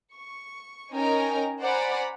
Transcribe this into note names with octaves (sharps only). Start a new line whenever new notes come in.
C#6
C#4 D#4 A#4 G5 G#5 A#5
C5 D5 F#5 G#5 A#5 B5